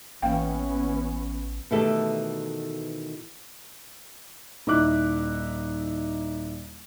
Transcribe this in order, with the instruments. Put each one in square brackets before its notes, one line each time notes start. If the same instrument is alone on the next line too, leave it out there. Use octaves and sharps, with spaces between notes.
[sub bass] A1 [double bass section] E3 B3 C#4 [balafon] A#3 F5 G5
[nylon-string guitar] B2 D#3 E3 A3 G4 A4
[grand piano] D#1 D#4 E4 D6 F#6